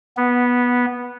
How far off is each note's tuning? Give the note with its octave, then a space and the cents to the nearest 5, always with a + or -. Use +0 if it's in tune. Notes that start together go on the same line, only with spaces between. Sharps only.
B3 -10